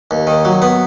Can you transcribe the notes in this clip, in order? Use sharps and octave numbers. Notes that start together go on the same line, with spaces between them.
D#2
D#3
F#3
B3